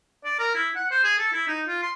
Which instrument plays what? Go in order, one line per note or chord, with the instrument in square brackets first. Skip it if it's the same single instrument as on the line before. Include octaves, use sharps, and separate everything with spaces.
[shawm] D5
A#4
E4
F#5
C5
G#4
A4
E4
D#4
F4
C6